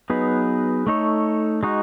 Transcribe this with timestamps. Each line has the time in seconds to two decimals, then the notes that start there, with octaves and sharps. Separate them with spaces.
0.10 F#3 B3 D#4 G#4 B4
0.87 A3 D#4 A4 C#5
1.63 G#3 D#4 F#4